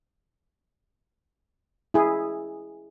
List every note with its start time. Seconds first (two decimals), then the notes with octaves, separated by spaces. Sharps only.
1.94 E4 G#4